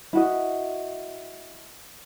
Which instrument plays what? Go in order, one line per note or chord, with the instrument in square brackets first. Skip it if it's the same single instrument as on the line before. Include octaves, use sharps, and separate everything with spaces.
[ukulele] E4 F#4 D#5